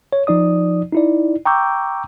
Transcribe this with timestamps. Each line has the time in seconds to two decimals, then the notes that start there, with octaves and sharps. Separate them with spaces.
0.13 C#5
0.27 F3 D#4 D5 D#6
0.93 D#4 E4 D5
1.45 G5 A#5 C#6 D6 E6 G6